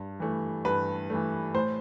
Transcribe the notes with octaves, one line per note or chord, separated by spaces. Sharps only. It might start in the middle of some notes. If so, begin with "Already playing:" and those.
Already playing: G2
E3 A3
G2 B4
E3 A3
A2 C5